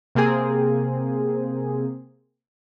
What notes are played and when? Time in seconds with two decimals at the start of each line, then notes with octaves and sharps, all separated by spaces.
0.15 C3 A#3 C4 G#4